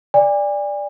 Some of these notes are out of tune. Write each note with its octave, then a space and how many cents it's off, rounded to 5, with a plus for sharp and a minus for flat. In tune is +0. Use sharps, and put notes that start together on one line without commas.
D5 +0 G#5 -40